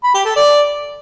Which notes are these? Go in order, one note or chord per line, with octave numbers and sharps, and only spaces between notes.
B5
G4
A4
D5